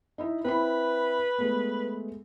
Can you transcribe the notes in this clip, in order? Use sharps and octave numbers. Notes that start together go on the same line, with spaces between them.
D#4 E4 E5
C4 E4 B4 B5
G#3 A3 B3